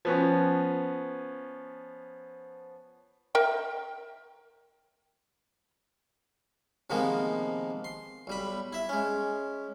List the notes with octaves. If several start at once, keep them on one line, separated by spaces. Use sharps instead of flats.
F3 B3 C#4
A#4 E5 G5
C3 D#3 F3 G#3 A#3 B3
C6
B1 G3 B5
E4 E5
G#3 C#4